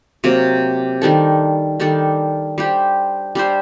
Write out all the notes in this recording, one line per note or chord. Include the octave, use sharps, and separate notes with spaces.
C3 F#3 A#3
D#3 G3 D4 A4
D#3 G3 D4 A4
G3 D4 G4 C5
G3 D4 G4 C5